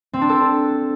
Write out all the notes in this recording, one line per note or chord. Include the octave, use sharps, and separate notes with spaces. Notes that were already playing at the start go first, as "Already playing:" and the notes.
C4
D4
A4